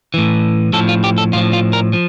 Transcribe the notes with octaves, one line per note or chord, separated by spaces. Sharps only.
A2 E3
A2 F3 A4
F4
G4
A4
A2 F3 F4
F4
A#4
F3